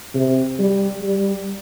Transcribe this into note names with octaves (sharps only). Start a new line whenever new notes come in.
C3
G3
G3